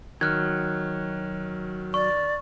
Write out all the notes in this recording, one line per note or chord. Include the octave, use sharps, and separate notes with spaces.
D#3 F#3 F6 F#6 G#6
D5 C#6